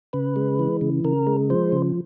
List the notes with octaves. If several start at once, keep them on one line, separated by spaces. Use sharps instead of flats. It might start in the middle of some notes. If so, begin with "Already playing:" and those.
C#3 B4
G#3
E3
C#3
C#3 A#4
G#3
F3 C5
C#3